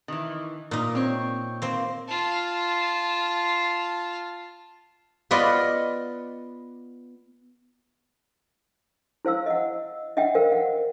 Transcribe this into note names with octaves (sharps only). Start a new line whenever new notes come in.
D#3 E3
A#2 D#4 A#4
C4 C#5
A#3 C4
F4 A5
B3 F4 B4 D5 D#5
E4 C5 F5 E6
D#5 F#5
D#5 E5 F#5 G5
A#4 C5 F5 G5
F#5